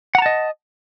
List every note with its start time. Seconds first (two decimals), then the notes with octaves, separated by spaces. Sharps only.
0.15 F#5
0.18 A#5
0.22 A5
0.26 D#5